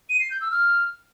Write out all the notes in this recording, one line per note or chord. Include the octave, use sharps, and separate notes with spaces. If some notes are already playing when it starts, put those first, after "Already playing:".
D#7
C7
G6
E6
F6